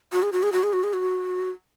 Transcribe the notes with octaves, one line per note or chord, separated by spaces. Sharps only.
F#4
G#4
F#4
G#4
F#4
G#4
F#4
G#4
F#4